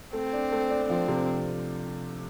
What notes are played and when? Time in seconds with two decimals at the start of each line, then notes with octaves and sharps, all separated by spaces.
0.13 A3 C4
0.33 D4
0.52 A3
0.70 D4
0.89 F3 C4
1.08 C3